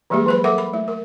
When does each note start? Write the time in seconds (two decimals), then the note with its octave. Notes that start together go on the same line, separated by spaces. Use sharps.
0.10 E3 G3 G#3 A#3 G4 G#4
0.26 F#3 B4 B5
0.44 A4 A#4 E5 F#5 D6
0.58 B5
0.74 A3
0.88 A#4